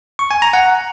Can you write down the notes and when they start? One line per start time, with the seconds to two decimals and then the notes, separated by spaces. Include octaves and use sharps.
0.19 C#6
0.31 G#5
0.42 A#5
0.53 F#5